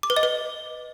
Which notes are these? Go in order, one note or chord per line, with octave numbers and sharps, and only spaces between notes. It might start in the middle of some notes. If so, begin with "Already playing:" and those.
D6
B4
D#5
B4